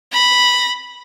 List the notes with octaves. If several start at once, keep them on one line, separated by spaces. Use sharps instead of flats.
B5 A#6